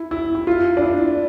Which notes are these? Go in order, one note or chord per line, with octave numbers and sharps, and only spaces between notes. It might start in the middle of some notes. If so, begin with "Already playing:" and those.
Already playing: E4
E4
E4
F4
D4
E4